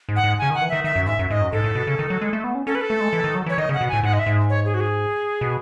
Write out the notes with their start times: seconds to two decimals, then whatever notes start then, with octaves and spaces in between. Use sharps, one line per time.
0.09 G#2
0.16 F#5
0.24 G#2
0.38 C#3 G#5
0.50 D#3
0.54 F#5
0.61 E3
0.69 D#3 E5
0.84 D#3 E5
0.95 F#2
1.06 G#2 E5
1.19 F#2
1.30 G#2 D#5
1.41 F#2
1.52 G#2 A4
1.64 A2
1.75 B2
1.87 C#3
1.99 D#3
2.10 F#3
2.21 G#3
2.33 A3
2.44 B3
2.55 C#4
2.67 C#4 A4
2.75 B4
2.81 A4
2.90 A3
3.01 G#3
3.13 E3
3.24 D#3
3.35 F#3
3.46 E3 C#5
3.58 D#3 D#5
3.69 C#3
3.74 F#5
3.81 B2
3.89 A2 G#5
4.03 G#2 F#5
4.13 D#5
4.19 E5
4.26 G#2
4.50 C#5
4.65 G#4
4.74 F#4
4.80 G#4
5.41 B2